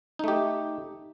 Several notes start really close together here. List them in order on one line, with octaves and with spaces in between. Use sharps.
D#4 A3 G4